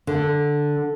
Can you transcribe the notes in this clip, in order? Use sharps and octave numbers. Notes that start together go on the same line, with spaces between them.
D3